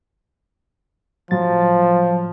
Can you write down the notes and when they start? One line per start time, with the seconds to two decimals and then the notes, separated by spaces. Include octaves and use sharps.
1.31 A2 F3 F#3 A6